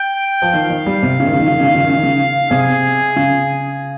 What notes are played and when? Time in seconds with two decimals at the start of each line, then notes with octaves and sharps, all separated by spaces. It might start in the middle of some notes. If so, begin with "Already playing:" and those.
Already playing: G5
0.42 F3
0.53 D#3 F5
0.70 D#3
0.86 G3
1.03 C3
1.20 C#3
1.26 D#3
1.33 C#3
1.40 D#3
1.47 C#3
1.54 D#3
1.61 C#3
1.68 D#3
1.75 C#3
1.82 D#3
1.90 C#3
1.97 D#3
2.03 C#3
2.51 C3 G#4
3.16 C#3